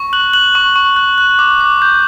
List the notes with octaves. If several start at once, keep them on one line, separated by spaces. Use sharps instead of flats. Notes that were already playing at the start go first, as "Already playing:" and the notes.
Already playing: C#6
F#6 F#7
F#6 F#7
C#6
C#6
F#6
F#6
D6
D6
G6